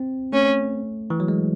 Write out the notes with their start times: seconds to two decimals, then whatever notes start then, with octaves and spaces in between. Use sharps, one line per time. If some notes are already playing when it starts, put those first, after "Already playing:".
Already playing: C4
0.33 A3 C#4
1.10 E3
1.20 F#3
1.28 G#3